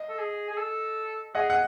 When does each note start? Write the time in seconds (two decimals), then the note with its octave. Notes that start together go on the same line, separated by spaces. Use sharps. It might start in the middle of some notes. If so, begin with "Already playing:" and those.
Already playing: D#5
0.09 A4
0.19 G#4
0.50 G#4
0.57 A4
1.35 G#4 D#5 F#5
1.50 F#5